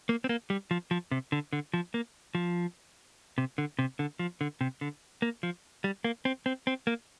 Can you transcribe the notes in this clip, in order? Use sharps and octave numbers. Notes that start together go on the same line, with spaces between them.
A#3
C4
A#3
G3
F3
F3
C3
D3
D3
F3
A#3
F3
C3
D3
C3
D3
F3
D3
C3
D3
A#3
F3
G3
A#3
C4
C4
C4
A#3